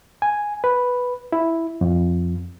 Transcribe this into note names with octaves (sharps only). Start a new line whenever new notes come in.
G#5
B4
E4
F2